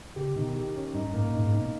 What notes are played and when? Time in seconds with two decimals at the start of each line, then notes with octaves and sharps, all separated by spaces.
0.16 C#3 G4
0.35 B2 D#3
0.56 G4
0.75 C#4
0.94 G2 D#4
1.04 G2
1.13 G#2 A#3
1.23 A#2
1.33 G#2 D#4
1.44 G#2
1.53 B2 D#4